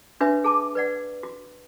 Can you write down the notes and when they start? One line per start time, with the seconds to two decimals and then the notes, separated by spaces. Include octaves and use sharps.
0.21 D4 F#4 B4 C#5 E5
0.44 G#4 A5 D6
0.75 B4 D5 F#5
1.23 F#4